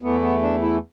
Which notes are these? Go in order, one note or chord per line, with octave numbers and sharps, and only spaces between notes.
E2 E3 A3 B3
B3
D4
E4